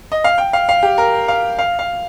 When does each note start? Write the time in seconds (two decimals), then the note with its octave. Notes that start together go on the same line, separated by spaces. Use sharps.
0.12 D#5
0.24 F5
0.38 G5
0.53 F5
0.69 F5
0.83 G4
0.98 A#4
1.28 F5
1.59 F5
1.79 F5